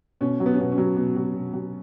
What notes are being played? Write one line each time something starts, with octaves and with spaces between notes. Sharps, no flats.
B2 C#4
F#3
B3
C#4
B2 B3
C#4
F#3
B2
F#3
B2
F#3